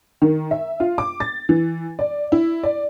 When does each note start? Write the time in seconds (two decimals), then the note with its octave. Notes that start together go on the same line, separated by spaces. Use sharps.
0.22 D#3
0.51 E5
0.80 F4
0.98 D6
1.20 A6
1.49 E3
1.99 D5
2.32 E4
2.63 D5